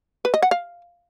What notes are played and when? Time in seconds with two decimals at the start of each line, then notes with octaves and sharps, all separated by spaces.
0.25 B4
0.34 D#5
0.42 F#5
0.51 F5